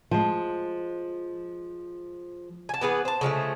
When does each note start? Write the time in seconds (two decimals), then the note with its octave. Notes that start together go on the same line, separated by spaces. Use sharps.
0.11 F3 G#3
2.69 G#5 A5
2.81 E3 B3 G#4 B4
3.05 C5 A5
3.21 C#3 F3 G#3 A3